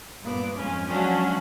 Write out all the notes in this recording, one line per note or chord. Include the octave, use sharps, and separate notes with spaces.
G2 A#2 B3 D6
F2 G#2 C#4 G#5
F3 F#3 G#3 C#4 D4 F#4